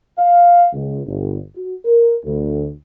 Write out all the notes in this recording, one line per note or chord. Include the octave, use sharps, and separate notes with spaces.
F5
C#2
G1
F#4
A#4
D2